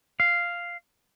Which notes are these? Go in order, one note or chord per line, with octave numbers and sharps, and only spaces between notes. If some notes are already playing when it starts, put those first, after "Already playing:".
F5